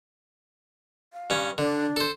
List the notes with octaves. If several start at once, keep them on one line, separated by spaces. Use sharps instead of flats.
F5
G2 C#4
D3 D4
A4 C5